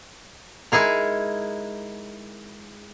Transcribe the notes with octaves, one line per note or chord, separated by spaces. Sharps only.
G#3 D#4 E4 G#4 A#4